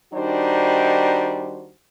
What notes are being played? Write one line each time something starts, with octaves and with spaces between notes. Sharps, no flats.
D#3 G3 D4 D#4 F#4 C5